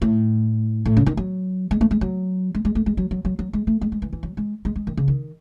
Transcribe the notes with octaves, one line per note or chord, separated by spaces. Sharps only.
A2
A2
C#3
D#3
F#3
G#3
A3
G#3
F#3
G#3
G#3
A3
G#3
F#3
F#3
F#3
F#3
G#3
A3
G#3
G#3
E3
E3
F#3
G#3
G#3
G#3
D#3
C#3
D#3